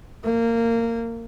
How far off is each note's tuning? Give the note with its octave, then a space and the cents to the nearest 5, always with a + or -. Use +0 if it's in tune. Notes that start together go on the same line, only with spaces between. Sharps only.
A#3 -20